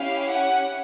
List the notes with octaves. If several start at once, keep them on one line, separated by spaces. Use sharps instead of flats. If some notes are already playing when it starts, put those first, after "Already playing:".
Already playing: C#4 E4 G4 F5
F#5